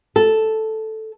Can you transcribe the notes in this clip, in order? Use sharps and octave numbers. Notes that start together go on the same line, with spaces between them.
A4